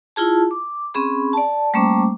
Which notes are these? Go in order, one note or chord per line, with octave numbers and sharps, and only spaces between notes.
E4 F4 G#4 A5
D6
C4 C#4 G#4 B5
D5 A5
G3 A3 A#3 C#4 C5 D6